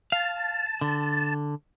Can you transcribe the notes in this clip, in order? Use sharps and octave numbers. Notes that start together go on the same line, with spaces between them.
F5 A5
D3